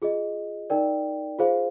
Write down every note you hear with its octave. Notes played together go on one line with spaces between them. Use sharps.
F4 G#4 D#5
D#4 A#4 D5 G5
F4 G#4 C5 F5